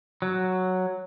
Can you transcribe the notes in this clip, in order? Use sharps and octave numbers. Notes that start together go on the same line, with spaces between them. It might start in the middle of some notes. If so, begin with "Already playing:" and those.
F#3